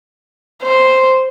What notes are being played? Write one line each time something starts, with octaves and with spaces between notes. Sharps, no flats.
C5